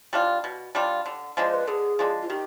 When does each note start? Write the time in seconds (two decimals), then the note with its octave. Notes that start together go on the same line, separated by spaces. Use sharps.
0.13 G3 D4 F4
0.44 B2
0.75 G3 D4 F4
1.06 D3
1.37 F3 G#3 D4 C5
1.54 B4
1.67 D3 G#4
1.99 F3 G#3 D4
2.22 F4
2.30 D#3 G4